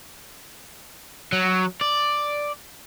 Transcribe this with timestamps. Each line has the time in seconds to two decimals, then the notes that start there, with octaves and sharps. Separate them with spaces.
1.32 F#3
1.81 D5